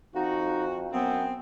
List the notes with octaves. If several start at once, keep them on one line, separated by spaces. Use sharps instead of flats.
F2 D#4 F#4
F#2 B3 C4